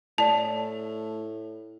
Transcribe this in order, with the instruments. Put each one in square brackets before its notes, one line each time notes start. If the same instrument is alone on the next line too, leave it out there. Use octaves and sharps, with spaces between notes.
[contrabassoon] A2 [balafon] D5 A5